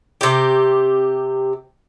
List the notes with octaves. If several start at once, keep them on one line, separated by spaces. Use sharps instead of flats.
C3 G4